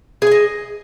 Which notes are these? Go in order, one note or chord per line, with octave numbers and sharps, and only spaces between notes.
G#4 D#5 G#5